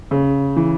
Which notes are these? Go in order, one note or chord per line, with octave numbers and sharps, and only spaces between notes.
C#3
E3